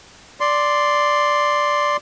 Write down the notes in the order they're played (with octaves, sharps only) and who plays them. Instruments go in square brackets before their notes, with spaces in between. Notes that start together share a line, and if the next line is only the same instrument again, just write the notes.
[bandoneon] D5 C6